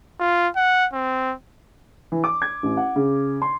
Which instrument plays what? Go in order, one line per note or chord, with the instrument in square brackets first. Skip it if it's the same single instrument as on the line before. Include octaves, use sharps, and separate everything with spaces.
[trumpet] F4
F#5
C4
[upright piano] E3
D6
G#6
A1
F#5
C#3
C6